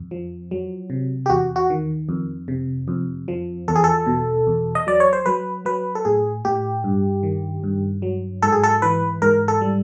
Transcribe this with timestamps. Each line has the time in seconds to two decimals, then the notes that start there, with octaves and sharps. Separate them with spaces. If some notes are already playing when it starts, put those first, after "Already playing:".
Already playing: F2
0.11 F3
0.51 F#3
0.90 C3
1.26 G4
1.30 E2 F#4
1.56 F#4
1.70 D#3
2.09 F2
2.48 C3
2.88 F2
3.28 F3
3.68 E2 A4
3.75 G#4
3.84 A4
4.06 B2
4.47 E2
4.75 D#5
4.87 F#3 D5
5.00 C#5
5.13 C5
5.26 F#3 B4
5.65 F#3 B4
5.95 A4
6.05 A2 G#4
6.45 A2 G4
6.84 G2
7.23 D#3
7.63 G2
8.02 F#3
8.42 G#2 A4
8.52 G#4
8.63 A4
8.82 E3 B4
9.22 G#2 A#4
9.48 A4
9.61 G3